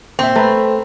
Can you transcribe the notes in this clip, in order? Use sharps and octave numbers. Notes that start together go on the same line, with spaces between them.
A#2 C4 E5
A3 B4 A#5 B5